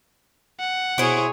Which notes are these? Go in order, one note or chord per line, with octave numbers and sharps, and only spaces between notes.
F#5
B2 E4 G#4 C5 C#5